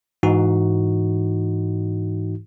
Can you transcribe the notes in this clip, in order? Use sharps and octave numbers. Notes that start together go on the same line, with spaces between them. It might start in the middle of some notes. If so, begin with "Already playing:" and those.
G#2 E3 D#4 F#4